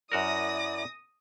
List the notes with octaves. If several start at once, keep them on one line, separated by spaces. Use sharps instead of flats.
F#2 E4 F#4 A#4 D5 D#6 A#6